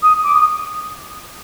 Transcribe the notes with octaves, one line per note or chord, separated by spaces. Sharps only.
D#6
D6
D#6